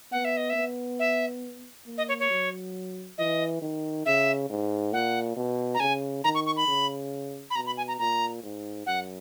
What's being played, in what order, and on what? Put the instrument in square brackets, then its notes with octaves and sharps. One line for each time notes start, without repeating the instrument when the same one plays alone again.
[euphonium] B3 [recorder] F#5
[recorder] E5
D#5
E5
[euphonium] B3
[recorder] E5
[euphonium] A#3
[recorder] D#5
C#5
C#5
[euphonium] F#3
[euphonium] E3 [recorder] D#5
[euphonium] D#3
[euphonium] C#3 [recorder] E5
[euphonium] G#2
[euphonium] A#2 [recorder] F#5
[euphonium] B2
[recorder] A#5
[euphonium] C#3 [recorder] G#5
[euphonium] D#3 [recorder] A#5
[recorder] C#6
C#6
B5
[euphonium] C#3
[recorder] B5
[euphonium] B2 [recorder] A#5
[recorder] B5
G#5
A#5
[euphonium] A#2 [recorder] A#5
[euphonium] G#2
[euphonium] F#2 [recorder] F#5